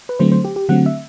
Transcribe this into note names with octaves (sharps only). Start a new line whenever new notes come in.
B4
D3 F#3 A3 C4 C5
C5
G4
G4
D3 F#3 A3 C4 F#5
E5